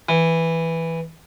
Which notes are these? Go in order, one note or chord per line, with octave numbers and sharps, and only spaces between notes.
E3